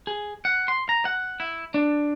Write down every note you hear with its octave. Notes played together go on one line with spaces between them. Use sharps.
G#4
F#5
C6
A#5
F#5
E4
D4